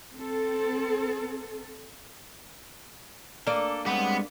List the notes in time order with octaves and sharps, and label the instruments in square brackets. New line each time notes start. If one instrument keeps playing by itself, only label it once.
[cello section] C4 A4
[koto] A#3 [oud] D4 D5 [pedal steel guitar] A4
[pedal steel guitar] G3 G#3 C4 [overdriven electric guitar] B3